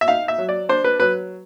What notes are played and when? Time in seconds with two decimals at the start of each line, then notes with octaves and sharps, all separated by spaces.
0.01 E5
0.08 D#4 F5
0.28 E5
0.38 F#3
0.49 D5
0.69 D4 C5
0.84 B4
1.00 F#3 B4